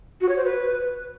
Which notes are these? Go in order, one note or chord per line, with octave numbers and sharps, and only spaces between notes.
F#4
C#5
C5
B4